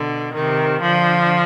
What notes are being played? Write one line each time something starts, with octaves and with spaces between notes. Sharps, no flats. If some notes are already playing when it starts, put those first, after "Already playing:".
Already playing: B2 D3
C3 D#3
D3 F3